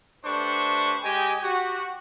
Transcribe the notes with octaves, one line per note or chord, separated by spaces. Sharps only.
A3 D4 G4 B4 C5 C#6
G#3 G4 D#5 G5 G#5
F#4 G4